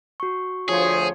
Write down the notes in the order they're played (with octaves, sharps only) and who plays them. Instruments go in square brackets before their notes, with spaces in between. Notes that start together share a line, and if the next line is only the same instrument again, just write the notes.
[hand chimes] F#4 C#6
[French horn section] D2 F3 [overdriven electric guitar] G#4 [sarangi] C#5